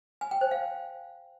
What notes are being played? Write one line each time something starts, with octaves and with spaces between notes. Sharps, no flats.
G#5
G5
C5
F5